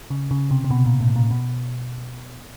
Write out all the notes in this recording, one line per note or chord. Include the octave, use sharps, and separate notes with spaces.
C#3
C#3
C3
C3
B2
A#2
A2
A#2
B2